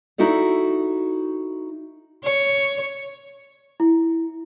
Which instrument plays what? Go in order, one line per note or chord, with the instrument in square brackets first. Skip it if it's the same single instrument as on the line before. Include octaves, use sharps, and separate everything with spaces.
[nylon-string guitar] D#4 E4 F#4 A4 D5
[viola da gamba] C#5
[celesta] E4